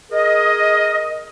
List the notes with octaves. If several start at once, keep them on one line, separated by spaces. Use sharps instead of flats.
G#4 A#4 D#5